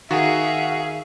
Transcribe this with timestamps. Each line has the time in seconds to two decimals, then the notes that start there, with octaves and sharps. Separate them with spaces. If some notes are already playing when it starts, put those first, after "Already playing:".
0.11 D#3 F#4 G#4 E5 F5